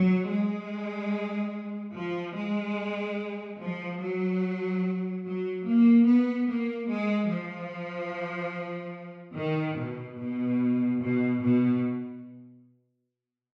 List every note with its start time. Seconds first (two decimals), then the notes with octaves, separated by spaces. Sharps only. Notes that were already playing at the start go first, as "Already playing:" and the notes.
Already playing: F#3
0.31 G#3
1.96 F3
2.36 G#3
3.60 F3
4.01 F#3
5.25 F#3
5.66 A#3
6.06 B3
6.48 A#3
6.89 G#3
7.29 F3
9.35 D#3
9.77 B2
10.18 B2
11.00 B2
11.40 B2